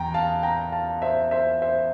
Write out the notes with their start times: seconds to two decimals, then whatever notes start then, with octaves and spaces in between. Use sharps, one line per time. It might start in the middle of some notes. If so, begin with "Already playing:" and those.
Already playing: E2 G5 A#5
0.14 F5 A5
0.43 G5 A#5
0.72 F5 A5
1.02 C5 E5
1.31 C5 E5
1.62 C5 E5